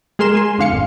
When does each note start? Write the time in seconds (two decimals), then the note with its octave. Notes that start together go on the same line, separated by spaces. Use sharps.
0.19 G#3 G#4 A#4 C6 E7
0.35 G#5 C6
0.58 F2 D3 F5 C#7
0.73 G#1